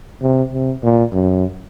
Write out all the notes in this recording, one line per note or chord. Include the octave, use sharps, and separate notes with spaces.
C3
C3
A#2
F#2